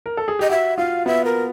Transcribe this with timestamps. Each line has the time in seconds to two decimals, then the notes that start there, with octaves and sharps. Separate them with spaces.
0.06 A#4
0.17 A4
0.28 G#4
0.39 G4 D#5
0.49 F#4 E5
0.78 F4 F5
1.06 B3 E5
1.25 A#4